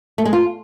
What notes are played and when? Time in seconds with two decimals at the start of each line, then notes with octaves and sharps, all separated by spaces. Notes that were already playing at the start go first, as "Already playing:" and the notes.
0.18 A3
0.25 G#3
0.33 F4